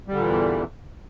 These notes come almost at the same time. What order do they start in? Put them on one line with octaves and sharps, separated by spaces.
G3 D3 A#2 E3 E2